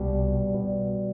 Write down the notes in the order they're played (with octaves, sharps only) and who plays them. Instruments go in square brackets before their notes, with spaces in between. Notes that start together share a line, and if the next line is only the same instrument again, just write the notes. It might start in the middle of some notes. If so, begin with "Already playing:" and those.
Already playing: [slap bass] C2 B2 G3
B2